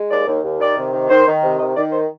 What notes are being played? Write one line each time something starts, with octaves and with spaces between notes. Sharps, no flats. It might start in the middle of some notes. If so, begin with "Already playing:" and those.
Already playing: G#3
D#2 D5
D#2
D#2
D#3 D5
C3
D#3
D#3 C5
D#3
C3
D#3 D#5
D#3 D5
C5